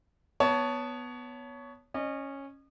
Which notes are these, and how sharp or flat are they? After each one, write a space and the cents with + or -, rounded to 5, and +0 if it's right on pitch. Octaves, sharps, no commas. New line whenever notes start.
B3 +0 C#5 +20 A5 +0
C#4 -10 D#5 -35